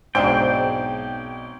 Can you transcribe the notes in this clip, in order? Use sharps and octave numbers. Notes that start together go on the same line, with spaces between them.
B1 G#2 F#3 C4 D4 C5 G5